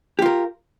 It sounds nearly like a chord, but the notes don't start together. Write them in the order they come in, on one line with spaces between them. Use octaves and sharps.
G4 F4 A#4